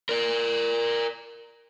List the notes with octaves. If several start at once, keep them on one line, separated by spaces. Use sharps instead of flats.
A#4 D5